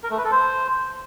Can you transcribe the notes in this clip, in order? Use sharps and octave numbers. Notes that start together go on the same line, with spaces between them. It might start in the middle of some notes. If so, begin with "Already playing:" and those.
A#4
A3
B4
A4
C5